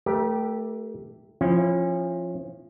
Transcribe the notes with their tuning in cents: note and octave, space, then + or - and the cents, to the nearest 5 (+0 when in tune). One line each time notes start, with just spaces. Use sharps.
A3 +0 G4 +0 A#4 +40
F3 +0 C#4 -30 E4 +15